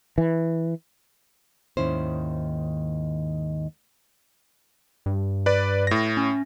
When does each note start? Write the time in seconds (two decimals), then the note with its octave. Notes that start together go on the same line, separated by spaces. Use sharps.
0.18 E3
1.77 D#2 G#2 D#3 C#4 E4 C5
5.06 G2
5.46 B4 D5
5.87 A2 A#6
6.17 C#4